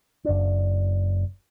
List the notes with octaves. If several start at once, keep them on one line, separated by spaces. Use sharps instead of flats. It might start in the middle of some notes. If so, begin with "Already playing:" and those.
F#1 D4